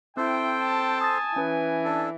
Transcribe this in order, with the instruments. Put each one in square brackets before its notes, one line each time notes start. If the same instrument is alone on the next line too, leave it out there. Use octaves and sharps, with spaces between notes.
[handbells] C4 [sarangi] E4 [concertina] A4 C5 [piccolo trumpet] G5
[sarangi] A5
[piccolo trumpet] G#5 [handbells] D#6 A6
[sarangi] E3 [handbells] C#4 B4
[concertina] D4 A4